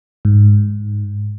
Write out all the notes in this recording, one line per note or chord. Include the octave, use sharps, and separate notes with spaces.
G#2